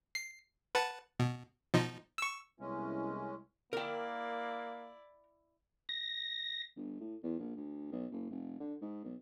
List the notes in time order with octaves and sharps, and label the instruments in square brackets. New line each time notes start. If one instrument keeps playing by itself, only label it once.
[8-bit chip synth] C7
B4 F#5 A5
B2
B2 F3 D#4
C#6 E6
[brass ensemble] C2 B3 E4 [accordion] G#3 C#4
[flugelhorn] A#3 [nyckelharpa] E4 D5 [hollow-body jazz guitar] A#4 G5
[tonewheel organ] A#6
[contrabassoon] G1
A2
E2
A#1
D2
B1
F#1
F1
D3
G#2
B1